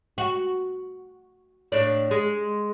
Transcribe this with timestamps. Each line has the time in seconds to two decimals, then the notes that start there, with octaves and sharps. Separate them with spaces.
0.18 F#4
1.72 A2 D4 D5
2.11 G#3